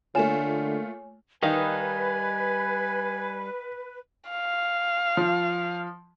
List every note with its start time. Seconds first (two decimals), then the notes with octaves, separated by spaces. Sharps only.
0.15 D3 A3 A#3 F4 C#5 G#5 E7
1.43 D#3 G3 D#4 B4 D#5 F5 G#5
4.30 F5
5.17 F3